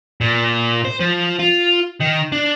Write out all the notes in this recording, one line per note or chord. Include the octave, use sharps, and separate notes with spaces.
A#2
C5
F3
F4
D#3
D4